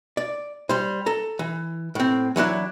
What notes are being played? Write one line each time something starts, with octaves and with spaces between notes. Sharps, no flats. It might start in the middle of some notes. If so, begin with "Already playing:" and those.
D5
G3 C5
A4 A#5
E3
A2 C4
E3 F#3 D4 E4